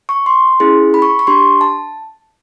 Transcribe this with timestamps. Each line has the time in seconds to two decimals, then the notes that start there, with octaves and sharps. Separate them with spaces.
0.09 C#6
0.26 C6
0.60 C#4 E4 G#4
0.94 B5
1.02 C#6
1.19 C#6
1.27 D4 G4 C6
1.61 A5